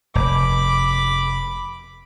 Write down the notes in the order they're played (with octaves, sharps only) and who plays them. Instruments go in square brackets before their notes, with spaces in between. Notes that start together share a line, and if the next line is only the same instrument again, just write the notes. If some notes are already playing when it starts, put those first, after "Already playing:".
[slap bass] F1 [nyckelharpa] B5 D6